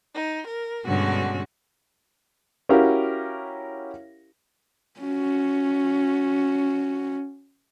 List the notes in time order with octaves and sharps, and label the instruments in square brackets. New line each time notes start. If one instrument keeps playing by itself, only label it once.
[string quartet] D#4
A#4
G2 B2 D3 G#3 C#4 F#4
[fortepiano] C#4 E4 F#4 G4 A#4 F5
[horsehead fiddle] C#4 F#4